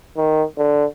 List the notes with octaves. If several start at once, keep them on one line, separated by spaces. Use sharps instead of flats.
D#3
D3